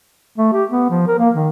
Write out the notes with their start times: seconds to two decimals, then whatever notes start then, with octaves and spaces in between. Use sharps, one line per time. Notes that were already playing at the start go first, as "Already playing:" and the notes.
0.38 A3
0.53 G4
0.70 B3
0.90 F3
1.07 A#4
1.19 A#3
1.35 D#3